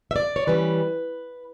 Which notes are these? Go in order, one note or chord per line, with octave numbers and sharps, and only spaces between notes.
E5
D5
C#5
E3 G3 C#4 B4